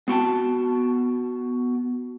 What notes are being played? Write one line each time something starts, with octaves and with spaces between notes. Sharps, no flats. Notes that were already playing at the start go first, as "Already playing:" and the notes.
B3 F#4 G5 A5